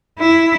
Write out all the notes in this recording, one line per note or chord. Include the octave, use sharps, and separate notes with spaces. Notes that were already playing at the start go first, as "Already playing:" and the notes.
E4